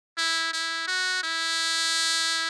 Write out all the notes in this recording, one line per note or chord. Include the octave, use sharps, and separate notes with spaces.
E4
E4
F#4
E4